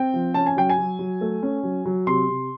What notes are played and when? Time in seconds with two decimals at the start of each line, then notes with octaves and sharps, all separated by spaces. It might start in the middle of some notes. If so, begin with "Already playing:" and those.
Already playing: C4 G5
0.14 F3
0.34 C#4 A5
0.46 G#5
0.56 F#3 G5
0.69 G#5
0.78 F#3
0.99 F#3
1.21 A3
1.43 C#4
1.63 F#3
1.85 F#3
2.07 C3 C6
2.29 C3